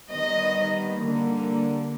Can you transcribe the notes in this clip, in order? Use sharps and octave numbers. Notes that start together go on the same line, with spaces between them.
D#3 G3 B3 D#5
D3 G3 A#3